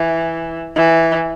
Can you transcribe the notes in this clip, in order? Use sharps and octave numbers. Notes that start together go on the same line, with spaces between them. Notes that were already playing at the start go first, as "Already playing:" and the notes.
Already playing: E3
E3